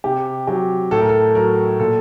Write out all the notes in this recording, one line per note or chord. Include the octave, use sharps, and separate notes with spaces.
C3 G4
F#3 G4
A2 A4
A#4
A4
F#3 A#4
A#2 A4